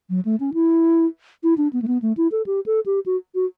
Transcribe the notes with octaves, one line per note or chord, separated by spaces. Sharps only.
F#3
A3
C#4
E4
E4
D4
B3
A3
B3
A3
E4
A4
G4
A4
G4
F#4
F#4